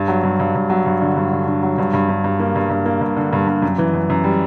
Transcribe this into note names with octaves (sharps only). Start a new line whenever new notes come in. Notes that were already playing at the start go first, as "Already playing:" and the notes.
Already playing: G2
F#3
G2
G2
G2
F#3
G2
D3
G2
D3
D3
F#3
G2
G2
G2
G2
A#3
G2
G2
A#3
G2
D3
G2
G2
F#2
E3
F#2
F#2
G3